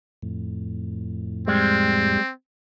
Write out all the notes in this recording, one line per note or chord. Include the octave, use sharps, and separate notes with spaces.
F2 A2
G3 G#3 C4